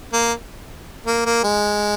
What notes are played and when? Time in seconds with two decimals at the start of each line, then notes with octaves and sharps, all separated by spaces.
0.13 A#3
1.07 A#3
1.26 A#3
1.44 G#3